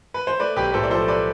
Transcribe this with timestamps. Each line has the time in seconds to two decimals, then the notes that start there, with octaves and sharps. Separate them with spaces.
0.14 B4
0.27 C5
0.40 A3 B4 D5
0.56 B1 G4 B4
0.74 A2 A4 C5
0.83 D5
0.91 F3 A4 C5
1.08 A3 B4 D5